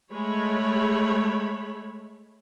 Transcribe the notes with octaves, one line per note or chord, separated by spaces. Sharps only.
G#3 A3 C#5 B5